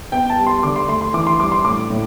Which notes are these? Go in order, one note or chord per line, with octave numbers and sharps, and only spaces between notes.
B3 G5
A5
G3
C6
D3 D6
C6
A3 C6
C6
E3 D6
C6
G2 D6
C6
A2 D6
A2